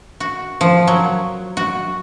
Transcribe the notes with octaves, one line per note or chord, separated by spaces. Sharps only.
F#4
F3
F#3
F#4